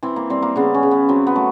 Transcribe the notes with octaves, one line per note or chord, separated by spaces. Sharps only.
E3 C4
A#3
G3 C4
A#3
C#3 B3
C#4
C#3
B3
F#3 C4
B3
A3